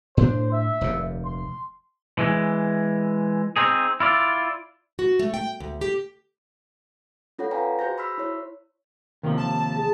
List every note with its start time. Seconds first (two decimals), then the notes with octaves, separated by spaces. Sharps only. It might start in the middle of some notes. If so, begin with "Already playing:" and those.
0.17 A2 C4 D4 C5
0.52 E5
0.81 F1 D#2 A#2
1.25 C6
2.19 E3 G#3
3.56 C4 D#4 G#4
4.00 E4 F4 D5
4.99 F#4
5.19 A3
5.34 G5
5.60 D2
5.81 G4
7.39 C#4 F4 A4 C#5 F#5
7.51 B4 D5 F5 G5 G#5 A#5
7.79 F#4 G#4 C5 G6 A#6
7.98 B5 C6 E6 F6 B6
8.18 E4 C#5
9.23 D#2 C3 D#3 F3
9.38 A5
9.76 G#4